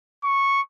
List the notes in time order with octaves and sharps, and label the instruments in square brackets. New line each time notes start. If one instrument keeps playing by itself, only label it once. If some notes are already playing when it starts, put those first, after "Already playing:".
[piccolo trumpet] C#6